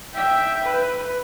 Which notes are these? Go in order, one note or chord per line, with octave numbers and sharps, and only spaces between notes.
E5 G5
B4